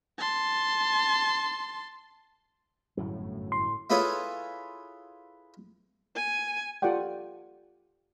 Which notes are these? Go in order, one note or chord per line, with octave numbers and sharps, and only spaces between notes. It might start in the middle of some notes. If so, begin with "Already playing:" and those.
A5 C6
G1 F#2 A2 F#3
C6
E4 F4 G#4 A4 B4 C#5
G#5
F4 G4 A4 D5 F#5 G5